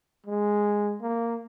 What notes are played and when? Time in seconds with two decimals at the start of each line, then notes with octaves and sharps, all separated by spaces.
0.26 G#3
1.01 A#3